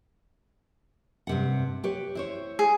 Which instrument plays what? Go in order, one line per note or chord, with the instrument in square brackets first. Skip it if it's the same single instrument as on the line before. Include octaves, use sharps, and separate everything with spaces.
[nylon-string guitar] G2 C3 F#5
G4 B4 C#5
E4 C5 C#5
[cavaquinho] G#4